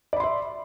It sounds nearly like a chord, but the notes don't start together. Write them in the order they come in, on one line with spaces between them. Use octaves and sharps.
D5 B5 C6 E5